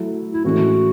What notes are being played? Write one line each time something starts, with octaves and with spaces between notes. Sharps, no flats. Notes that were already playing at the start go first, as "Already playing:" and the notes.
Already playing: F#3 A3 E4
E4
A2 E3 G#3 C#4 F#4